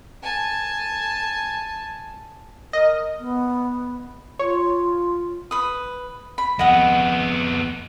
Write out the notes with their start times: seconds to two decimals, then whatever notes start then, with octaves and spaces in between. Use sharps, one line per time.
0.23 G#5 A5
2.73 A#4 D#5
3.20 B3
4.39 F4 C#5
5.51 B4 D#6
6.38 B5
6.59 F2 B3 D#5 F#5